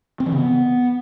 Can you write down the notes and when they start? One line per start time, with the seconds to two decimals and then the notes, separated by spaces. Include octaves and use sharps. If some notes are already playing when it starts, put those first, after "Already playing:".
0.20 C4
0.26 E3
0.32 C#3
0.38 B3